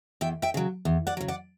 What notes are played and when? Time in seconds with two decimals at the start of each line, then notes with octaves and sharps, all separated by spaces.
0.21 E2 E5 G5
0.42 E5 G5
0.54 C#3 F#3
0.85 E2
1.07 D5 F#5
1.17 C#3 F#3
1.28 D5 F#5